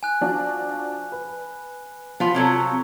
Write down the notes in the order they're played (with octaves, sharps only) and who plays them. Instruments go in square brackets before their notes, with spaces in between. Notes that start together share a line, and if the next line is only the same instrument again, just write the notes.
[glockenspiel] G#5 F#6
[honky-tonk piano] F3 D4 F#4
B4
[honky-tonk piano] F3 [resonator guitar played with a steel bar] B3 F4
[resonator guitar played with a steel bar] C3 F#3 A4 [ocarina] C4